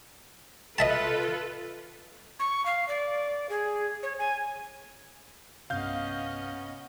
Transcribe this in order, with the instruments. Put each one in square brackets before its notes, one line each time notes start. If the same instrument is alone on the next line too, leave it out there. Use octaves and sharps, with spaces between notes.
[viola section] F4 A4 B4 [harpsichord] D#5 E5 A5
[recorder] C#6
F5
D5
G#4
C#5
G#5
[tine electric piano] B1 G2 C3 [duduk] B3 [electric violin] C#4 D#5 [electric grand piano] F5 G6